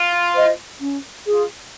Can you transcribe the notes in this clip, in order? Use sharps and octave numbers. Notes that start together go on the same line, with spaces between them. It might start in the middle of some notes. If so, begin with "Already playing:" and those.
Already playing: F4
C5 D#5
C#4
F4 G#4